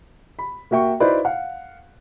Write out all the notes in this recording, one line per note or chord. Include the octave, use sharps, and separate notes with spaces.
B5
A#3 F#4 E5 G5 C#6
D#4 E4 F#4 B4 C5 D5
F5 F#5